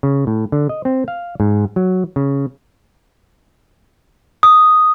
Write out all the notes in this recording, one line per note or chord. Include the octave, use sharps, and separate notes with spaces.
C#3
A2
D3
D#5
C4
F5
G#2
F#3
C#3
D#6